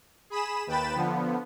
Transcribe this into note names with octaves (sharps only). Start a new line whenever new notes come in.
G#4 B5 D#6 E7
D#2 B4 G5 B5 A6 E7
D3 F3 B3